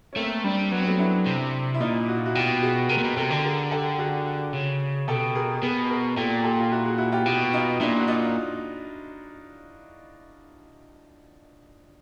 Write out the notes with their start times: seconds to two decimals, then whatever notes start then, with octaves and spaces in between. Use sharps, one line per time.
0.13 C#4
0.16 A3 A#3 C4
0.44 G3 C4 D4
0.71 F#3 B3
0.79 C4
0.87 A3 B3
0.99 D4 E4
1.26 C3
1.74 E4
1.80 A#2 D#4 F4
2.08 F#4
2.16 F4
2.25 E4 F#4
2.35 B2 F4 G4
2.63 F#4 G#4
2.89 C3 G#4 A#4
2.98 A#2
3.04 B2
3.17 C3 G4 A4
3.31 D3
3.44 G#4 A#4
3.71 G4 A4
3.99 F#4 G#4
4.53 C#3
5.08 B2 G4 A4
5.35 G#4 A#4
5.62 B2 G#4 A#4
5.89 G#4 A#4
6.17 A#2 G4 A4
6.44 G4 A4
6.60 F4
6.72 E4 F#4
6.85 F#4 G#4
6.98 E4 F#4
7.12 F4 G4
7.26 B2 F4 G4
7.53 D#4 F4
7.80 A#2 D4 E4
7.99 F#4
8.08 D#4 F4